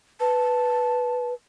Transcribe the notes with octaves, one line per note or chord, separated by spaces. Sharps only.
B4 A5